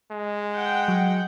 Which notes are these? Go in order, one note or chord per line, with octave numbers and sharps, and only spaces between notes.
G#3
F#5 G5
F#3